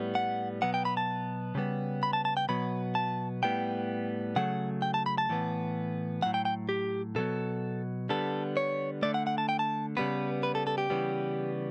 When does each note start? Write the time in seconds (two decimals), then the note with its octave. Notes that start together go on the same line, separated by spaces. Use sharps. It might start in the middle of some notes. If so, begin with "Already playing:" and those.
Already playing: A2 G3 B3
0.15 F#5
0.62 B2 F#3 B3 F#5
0.74 G5
0.85 B5
0.97 A5
1.55 C#3 G3 B3
2.03 B5
2.13 A5
2.25 A5
2.37 G5
2.49 B2 F#3 B3 B5
2.95 A5
3.43 A2 G3 B3 G5
4.36 C#3 F#3 A3 F#5
4.82 G5
4.94 A5
5.06 B5
5.18 A5
5.29 A2 E3 B3
6.22 A2 F#3 A3 F#5
6.34 G5
6.45 G5
6.69 G4
7.16 B2 F#3 B3 A4
8.09 D3 G3 B3 A4
8.57 C#5
9.02 D3 A3 D5
9.14 F#5
9.27 F#5
9.38 A5
9.49 G5
9.59 A5
9.97 C#3 G3 B3 B4
10.43 B4
10.55 A4
10.67 A4
10.78 G4
10.90 C#3 E3 G3 B3